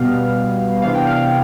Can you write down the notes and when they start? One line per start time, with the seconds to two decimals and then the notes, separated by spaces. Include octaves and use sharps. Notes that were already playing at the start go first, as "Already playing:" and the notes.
Already playing: B2 G3 B3 F5
0.82 C3 E3 B3 D4 F5
0.94 G5
1.07 F5